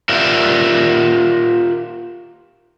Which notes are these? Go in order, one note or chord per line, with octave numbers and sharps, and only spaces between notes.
F4 G4 A#4 D5 E5 F#5